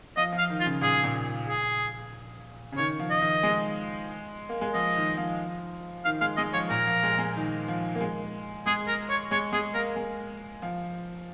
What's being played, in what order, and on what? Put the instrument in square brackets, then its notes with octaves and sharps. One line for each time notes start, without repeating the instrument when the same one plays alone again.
[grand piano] F3 [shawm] D#5
[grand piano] F3
[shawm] F5
[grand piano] D#3
[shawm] F4
[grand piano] C#3
[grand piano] A#2 [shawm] G#4
[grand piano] A#2
[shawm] G#4
[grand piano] C#3
[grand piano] D#3 [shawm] C#5
[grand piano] F3
[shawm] D#5
[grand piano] D#3
G#3
A#3
G#3
[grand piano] F3 [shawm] D#5
[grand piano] D#3
F3
[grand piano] D#3 [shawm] F5
[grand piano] G#3 [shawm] F5
[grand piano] G#3 [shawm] D#5
[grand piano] F3 [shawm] C#5
[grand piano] A#2 [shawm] A#4
[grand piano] F3
G#3
G#3
D#3
F3
A#3
G#3
[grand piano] G#3 [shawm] G#4
[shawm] A#4
C#5
[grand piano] G#3 [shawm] C#5
[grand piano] G#3 [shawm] G#4
[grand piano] A#3 [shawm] A#4
[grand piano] G#3
F3